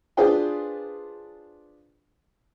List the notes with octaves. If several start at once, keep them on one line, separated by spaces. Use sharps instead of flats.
D4 F4 G#4 B4 C5 G5